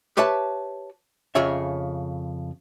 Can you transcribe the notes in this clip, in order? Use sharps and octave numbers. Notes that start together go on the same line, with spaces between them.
G4 B4 C#5 E5 A5
F2 C#3 G#4 C#5 E5